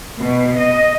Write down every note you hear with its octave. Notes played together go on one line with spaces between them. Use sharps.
B2
D#5